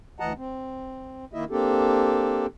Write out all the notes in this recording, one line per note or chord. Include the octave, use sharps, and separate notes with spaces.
D2 E3 D#5 F#5 A5 A#5
C4
D#3 A#3 E4 D#5 E5
A#3 C4 D4 G4 A4